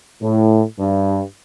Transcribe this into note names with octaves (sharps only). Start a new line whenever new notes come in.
A2
G2